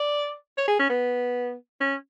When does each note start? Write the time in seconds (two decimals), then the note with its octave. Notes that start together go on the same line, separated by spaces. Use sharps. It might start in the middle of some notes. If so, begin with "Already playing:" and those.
Already playing: D5
0.58 C#5
0.68 G#4
0.79 C#4
0.89 B3
1.81 C#4